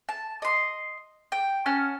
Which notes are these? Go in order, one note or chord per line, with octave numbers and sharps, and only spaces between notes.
A5
D#5 C6
G5
C#4 F#5 A5 F6